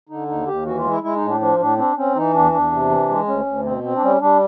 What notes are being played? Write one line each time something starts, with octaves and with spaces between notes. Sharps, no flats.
D3 D#4
D#2 D#4
D#2 G4
E3 F#4
F4
G#3
E4
G#3 E4
D#4
A2
D4
F3 D4
A2 D4
C4 D4
C4 C#4
E3 D#4
E2 D4
E2 D4
C3
E3
G#3
D2 C#4
D2
B2 C4
C4
D4
G3 C#4
G3 D4